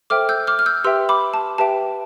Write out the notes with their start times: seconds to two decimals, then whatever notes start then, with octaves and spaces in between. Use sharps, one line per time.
0.10 A4 C5 E5 G5 D6 F6
0.29 E6 G6
0.47 D6 F6
0.59 F6
0.66 E6 G6
0.84 G4 B4 E5 G5 C6 E6
1.09 B5 D6
1.34 A5
1.58 G4 B4 E5 G5 A5